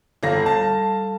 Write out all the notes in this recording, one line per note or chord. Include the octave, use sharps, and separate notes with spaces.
G1 G3 A4 F5 A#6
A5